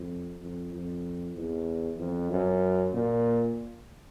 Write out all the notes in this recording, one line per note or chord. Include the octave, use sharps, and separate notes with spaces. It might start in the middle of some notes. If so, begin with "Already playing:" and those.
Already playing: F2
F2
F2
E2
F2
F#2
A#2